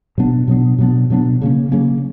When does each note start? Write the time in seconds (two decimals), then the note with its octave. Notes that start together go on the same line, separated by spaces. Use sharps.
0.18 B2 F#3 B3 D4
0.48 B2 F#3 B3 D4
0.78 B2 F#3 B3 D4
1.10 B2 F#3 B3 D4
1.41 C#3 F#3 A#3 C#4
1.72 C#3 F#3 A#3 C#4